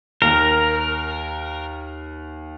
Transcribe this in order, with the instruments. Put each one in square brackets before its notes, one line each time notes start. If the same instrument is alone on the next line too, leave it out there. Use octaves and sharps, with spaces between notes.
[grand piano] D#2 [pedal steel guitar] A#4